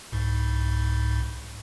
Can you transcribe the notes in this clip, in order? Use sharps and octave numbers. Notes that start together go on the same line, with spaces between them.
C2 G#2